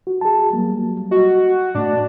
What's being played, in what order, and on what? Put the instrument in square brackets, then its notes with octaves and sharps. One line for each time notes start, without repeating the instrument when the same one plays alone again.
[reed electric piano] F#4
G#4 A5
F#3 G3 A#3
[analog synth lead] F#4 [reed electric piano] D#5
[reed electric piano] A2 A3 [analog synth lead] D4